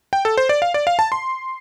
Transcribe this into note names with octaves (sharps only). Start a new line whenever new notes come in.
G5
A4
C5
D5
F5
D5
F5
A5
C6